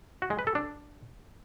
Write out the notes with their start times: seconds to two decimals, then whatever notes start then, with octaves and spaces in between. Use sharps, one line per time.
0.22 F#4
0.30 G#3
0.39 B4
0.47 A4
0.55 D4